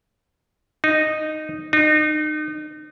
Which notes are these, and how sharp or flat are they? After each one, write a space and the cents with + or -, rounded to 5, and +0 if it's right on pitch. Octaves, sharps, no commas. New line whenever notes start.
D#4 -10
D#4 -35